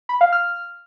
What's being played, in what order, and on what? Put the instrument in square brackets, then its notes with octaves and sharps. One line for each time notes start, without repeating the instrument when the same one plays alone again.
[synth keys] B5
F5
F6